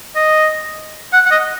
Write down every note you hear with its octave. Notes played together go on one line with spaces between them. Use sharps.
D#5
F#5
F#5
D#5